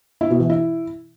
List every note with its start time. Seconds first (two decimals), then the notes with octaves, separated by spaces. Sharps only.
0.21 E4
0.30 B2
0.40 E3
0.50 E4